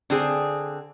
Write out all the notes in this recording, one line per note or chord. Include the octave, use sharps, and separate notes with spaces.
D3 C4 G#4